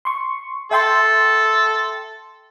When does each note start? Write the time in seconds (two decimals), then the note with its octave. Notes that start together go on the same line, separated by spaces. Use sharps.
0.05 C6 C#6
0.71 A4 E5 G5 C6